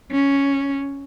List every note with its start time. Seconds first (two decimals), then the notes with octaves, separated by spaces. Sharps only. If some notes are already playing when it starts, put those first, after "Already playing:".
0.11 C#4